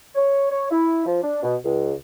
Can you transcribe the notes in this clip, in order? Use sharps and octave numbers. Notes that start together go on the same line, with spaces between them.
C#5
C#5
E4
F3
D4
B2
C#2